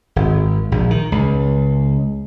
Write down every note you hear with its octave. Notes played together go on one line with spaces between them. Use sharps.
G#1
A#1
D#3
C#2